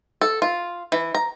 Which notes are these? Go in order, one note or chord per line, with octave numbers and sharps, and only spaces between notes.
A4
F4
E3
A#5